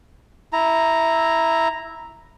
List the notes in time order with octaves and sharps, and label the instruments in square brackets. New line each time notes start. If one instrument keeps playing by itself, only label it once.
[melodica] E4 A#5